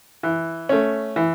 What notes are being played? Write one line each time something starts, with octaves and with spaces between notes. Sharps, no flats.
E3
A3 C#4
E3